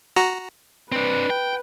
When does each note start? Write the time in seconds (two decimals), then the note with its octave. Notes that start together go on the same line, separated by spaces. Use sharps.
0.16 F#4 A#5
0.92 C4 D4 B4
1.30 G5